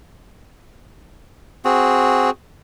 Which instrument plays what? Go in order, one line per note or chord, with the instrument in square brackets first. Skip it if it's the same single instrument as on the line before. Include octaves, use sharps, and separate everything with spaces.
[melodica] C4 F#4 G#4